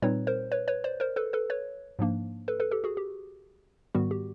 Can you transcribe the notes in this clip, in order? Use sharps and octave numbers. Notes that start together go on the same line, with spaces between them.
A#2 G3 C4 D#4 B4 C#5
A#4 C5
B4 C#5
B4 C#5
C5 D5
A#4 C5
A4 B4
A4 B4
B4 C#5
G#2 F3 A#3 D4
A4 B4
A4 B4
G4 A4
F#4 G#4
G4
G#2 D#3 G3 B3 F#4
G4